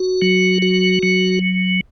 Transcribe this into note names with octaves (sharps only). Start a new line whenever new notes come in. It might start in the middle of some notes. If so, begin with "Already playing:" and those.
Already playing: F#4
F#3
F#4
F#3